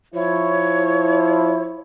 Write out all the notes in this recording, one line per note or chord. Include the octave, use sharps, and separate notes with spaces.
F3 E4 C#5